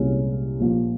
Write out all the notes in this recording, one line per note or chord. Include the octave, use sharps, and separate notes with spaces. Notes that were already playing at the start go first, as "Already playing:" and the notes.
Already playing: C2 A#2 G#3 C#4
A#1 A#2 F3 A#3